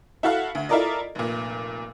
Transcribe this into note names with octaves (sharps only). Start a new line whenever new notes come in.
E4 F#4 A4 F5 F#5
D2
E4 F4 A4 A#4 D5 D#5
F1 A#2